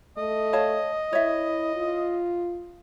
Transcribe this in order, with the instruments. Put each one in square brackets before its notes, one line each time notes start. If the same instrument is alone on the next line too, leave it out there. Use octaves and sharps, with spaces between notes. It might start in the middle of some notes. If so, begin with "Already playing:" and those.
[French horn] A3 [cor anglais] D#5
[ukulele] C#5 F5 A5
[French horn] E4 [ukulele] C#5 E5
[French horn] F4